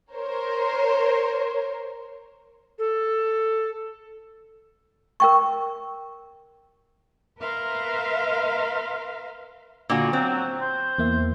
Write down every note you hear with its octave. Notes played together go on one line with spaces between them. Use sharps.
A#4 C5 C#5
A4
A#4 G5 C#6
A#4 B4 E5 F5 A#5 C6
A#2 D3 F#4
F#3 C4
C5
E2 A#3 E5